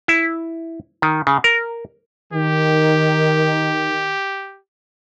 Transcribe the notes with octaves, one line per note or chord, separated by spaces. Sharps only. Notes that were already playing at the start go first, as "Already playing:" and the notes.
E4
D#3
C#3
A#4
D#3 G4